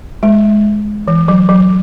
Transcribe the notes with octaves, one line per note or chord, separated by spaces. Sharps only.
G#3
E3
F#3
F#3